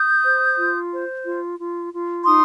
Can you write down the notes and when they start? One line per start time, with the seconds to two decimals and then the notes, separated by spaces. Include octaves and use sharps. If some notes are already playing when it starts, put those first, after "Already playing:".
Already playing: D#6 G6
0.24 C5
0.58 F4
0.92 C5
1.25 F4
1.58 F4
1.93 F4
2.26 D#4 C6 D#6